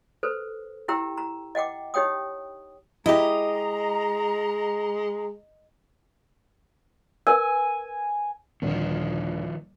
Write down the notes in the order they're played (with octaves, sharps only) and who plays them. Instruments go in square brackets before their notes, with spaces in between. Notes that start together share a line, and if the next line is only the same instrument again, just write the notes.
[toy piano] A4 B4 C5
E4 G4 G5 A#5 E6
A#5
D#5 F#5 G5 D6
D#4 G4 C#5 G5 D#6
[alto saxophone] G#3 [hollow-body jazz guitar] E4 G4 [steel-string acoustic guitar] D#5 [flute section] A#5
[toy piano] A#4 B4 E6 [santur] G#5
[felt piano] D#1 D3 [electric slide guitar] D#3 F3